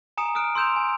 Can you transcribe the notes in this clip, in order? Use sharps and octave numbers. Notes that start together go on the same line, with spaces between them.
G#5 A#5 D#6 C#7 E7
D#6 F6 F#6 D7
C6 E6 G6 E7 F7
G#5